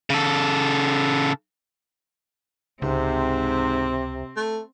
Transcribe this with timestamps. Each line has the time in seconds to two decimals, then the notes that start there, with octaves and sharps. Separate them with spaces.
0.10 C#3 A4
2.82 C#2 G#2 C3 C4
4.37 A3